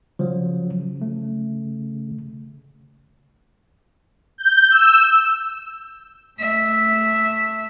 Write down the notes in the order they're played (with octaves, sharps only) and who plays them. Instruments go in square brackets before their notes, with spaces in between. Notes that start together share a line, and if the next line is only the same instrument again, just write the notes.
[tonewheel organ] C#3 [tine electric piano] F3 F#3
[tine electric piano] A3
[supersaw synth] G6
E6
[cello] A3 E5